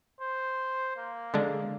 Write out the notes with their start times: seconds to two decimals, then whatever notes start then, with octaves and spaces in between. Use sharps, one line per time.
0.21 C5
0.97 A#3
1.34 D3 G#3 D4